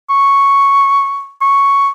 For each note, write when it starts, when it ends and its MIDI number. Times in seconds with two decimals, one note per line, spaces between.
0.10 1.33 85
1.42 1.89 85